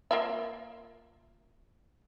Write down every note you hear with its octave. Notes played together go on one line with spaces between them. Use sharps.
A#3 F4 E5